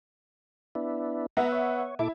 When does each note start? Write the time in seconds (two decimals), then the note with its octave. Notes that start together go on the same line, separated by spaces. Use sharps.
0.75 B3 D4 E4
1.37 B3 E5 F#5 A#5
1.52 C#5
1.99 A#2 E4 A4 D6